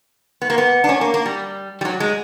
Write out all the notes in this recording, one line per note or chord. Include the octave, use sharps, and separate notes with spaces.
B3
A#3
B3
D4
C#4
A#3
A#3
G3
G3
F#3
G#3